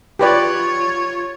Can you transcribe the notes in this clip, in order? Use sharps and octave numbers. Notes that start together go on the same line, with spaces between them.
F4 G4 B4 C#5 D5